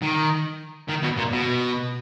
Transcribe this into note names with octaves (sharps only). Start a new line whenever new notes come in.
D#3
D#3
B2
A#2
B2